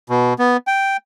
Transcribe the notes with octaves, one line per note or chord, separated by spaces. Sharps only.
B2
B3
G5